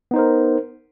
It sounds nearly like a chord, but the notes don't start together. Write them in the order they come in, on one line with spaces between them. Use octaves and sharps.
B3 D#4 C5 A#4